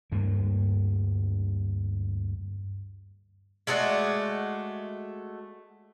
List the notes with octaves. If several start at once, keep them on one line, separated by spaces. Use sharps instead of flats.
D2 G2 A#3
G#3 A3 F#4 D5